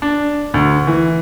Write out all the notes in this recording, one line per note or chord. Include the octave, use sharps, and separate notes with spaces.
D4
D2
E3